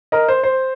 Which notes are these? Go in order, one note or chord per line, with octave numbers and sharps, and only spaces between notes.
A#4 D#5
C5
C5